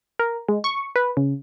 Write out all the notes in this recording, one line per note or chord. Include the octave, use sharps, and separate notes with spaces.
A#4
G#3
C#6
B4
C#3